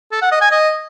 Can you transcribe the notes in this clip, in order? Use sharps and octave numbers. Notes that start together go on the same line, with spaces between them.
A4
F#5
D#5
G#5
D#5